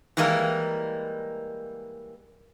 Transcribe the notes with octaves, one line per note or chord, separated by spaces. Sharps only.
E3 G3 G#3 A#3 D#4 A#4